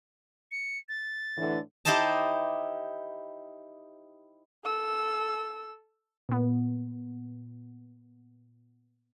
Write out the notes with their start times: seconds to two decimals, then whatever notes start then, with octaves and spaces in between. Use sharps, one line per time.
0.52 C#7
0.89 A6
1.37 A2 D3 E3
1.85 D#4 E4 G4 C5 D#5 A5
4.65 A4 E6
6.29 A#2 B3